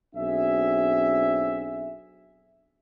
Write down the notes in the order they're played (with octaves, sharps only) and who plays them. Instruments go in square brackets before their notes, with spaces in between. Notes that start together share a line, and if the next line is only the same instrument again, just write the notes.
[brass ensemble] B1 C4 D4 F#4 G#4 E5